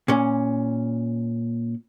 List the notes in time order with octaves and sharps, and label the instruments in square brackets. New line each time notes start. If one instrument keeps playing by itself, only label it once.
[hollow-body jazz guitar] A#2 C#4